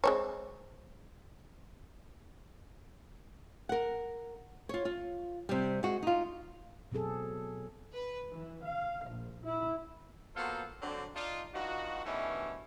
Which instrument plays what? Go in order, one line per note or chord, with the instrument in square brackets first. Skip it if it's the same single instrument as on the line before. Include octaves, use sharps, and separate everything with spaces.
[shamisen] G#3 C4 C#5
[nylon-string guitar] A#4 F#5
F4 C#5
F4
C3 G3
G#3 F#4
D#4 F4
[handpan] B2 F#3 C4 G#4 A4
[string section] B4
E3
F5
A#1
E4
[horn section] F#3 A#3 B3 F4 A4 C5
D3 F#3 C4
D4 D#4 F4
G2 D#4 F4 F#4
G2 B2 D#3 E3 A3 C#4